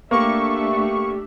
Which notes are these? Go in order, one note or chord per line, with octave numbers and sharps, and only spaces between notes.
A3 A#3 D4 G4 E5 C#6